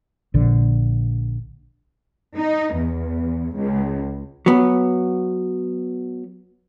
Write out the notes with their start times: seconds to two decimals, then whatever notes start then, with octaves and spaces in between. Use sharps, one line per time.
0.34 A#1 D3
2.37 D#4
2.76 E2
3.56 C#2
4.46 F#3 B3